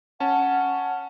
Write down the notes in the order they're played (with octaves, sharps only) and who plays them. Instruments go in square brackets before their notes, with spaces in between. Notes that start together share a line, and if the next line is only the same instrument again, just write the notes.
[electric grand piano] C#4 A5 [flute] F#5